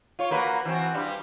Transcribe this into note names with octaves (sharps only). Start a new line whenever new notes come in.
F4 C#5
A#3 F#4 B4
E3 C4 F#4
G2 G3